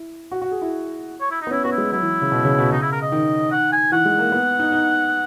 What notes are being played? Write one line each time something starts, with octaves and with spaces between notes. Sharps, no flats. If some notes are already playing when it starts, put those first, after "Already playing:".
Already playing: E4
F#4
F#4
G#4
E4
C#5
E4
D#4
B3
C#4 E4
B3 F#4
E4
G#3
F#3 E4
E3
C#3
B2
C#3
B2
C#3 D#4
E4
A#4
D#5
D#3
F#5
G#5
E3 F#5
G#3
A#3
B3
D#4
D#4